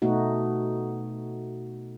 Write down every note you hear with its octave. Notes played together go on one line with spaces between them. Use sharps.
B2 A3 D#4 F#4